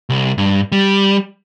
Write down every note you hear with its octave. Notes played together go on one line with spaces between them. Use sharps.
C2
G2
G3